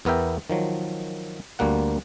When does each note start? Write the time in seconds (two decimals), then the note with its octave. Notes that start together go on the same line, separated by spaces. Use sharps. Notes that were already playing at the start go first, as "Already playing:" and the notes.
0.05 E2 B3 A#4 E5 G5
0.50 D#3 F3 F#3
1.59 D2 G3 A#3 F#5